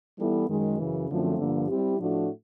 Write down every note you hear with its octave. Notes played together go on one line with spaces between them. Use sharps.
E3 G3 B3 E4 A4
F#2 D#3 G#3
F#2 C#3 E3
F#2 D3 F3 A3 C4
G2 D3 F3 A#3
G3 C4 E4 G4
A2 F3 A3 D4 F#4